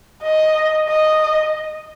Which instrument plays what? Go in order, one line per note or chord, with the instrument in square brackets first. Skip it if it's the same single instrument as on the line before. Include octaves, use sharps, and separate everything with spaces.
[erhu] D#5
D#5